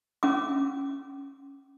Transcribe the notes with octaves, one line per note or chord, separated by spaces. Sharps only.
C#4 D6